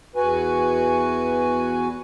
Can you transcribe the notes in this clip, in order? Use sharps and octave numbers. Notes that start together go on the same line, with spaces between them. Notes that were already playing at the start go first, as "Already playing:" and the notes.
E2 F#4 B4 G#5